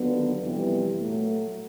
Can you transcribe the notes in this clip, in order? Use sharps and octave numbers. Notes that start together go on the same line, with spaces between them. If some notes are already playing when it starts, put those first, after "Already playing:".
Already playing: D#2 D3 F#3 B3
F2 C3 E3 G3 B3
A#2 F#3 A3